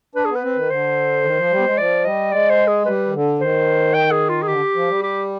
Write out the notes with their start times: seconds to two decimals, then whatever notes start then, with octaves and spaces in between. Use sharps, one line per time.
0.15 D4 B4
0.25 B3 G#4
0.35 B4
0.43 C4
0.55 D#3
0.70 D3 C5
1.23 D#3
1.37 F3
1.51 G3
1.59 B3
1.64 G#3
1.78 F3 D5
2.04 G3 D#5
2.31 G#3 D5
2.50 C5
2.67 G#4
2.85 G3 B4
3.07 D#3
3.13 D3
3.40 D#3 C5
3.94 G5
4.11 G#4
4.29 F4
4.42 G#4
4.47 D3 G4
4.75 F3
4.88 G3
5.03 G4